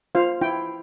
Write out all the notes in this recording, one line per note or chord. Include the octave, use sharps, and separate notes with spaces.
F4 C5 F5
E4 G5